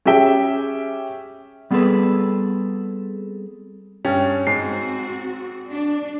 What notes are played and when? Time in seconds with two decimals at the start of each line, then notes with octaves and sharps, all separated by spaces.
0.05 C#4 G4 G#4 E5 G5
1.71 G3 B3 C4 G#4 A4 B4
4.05 G2 C#4
4.47 G#2 C4 F#4 C7
5.72 D4